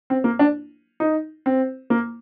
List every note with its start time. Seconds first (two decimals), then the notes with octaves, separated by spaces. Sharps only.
0.10 C4
0.24 A#3
0.39 D4
1.00 D#4
1.46 C4
1.90 A#3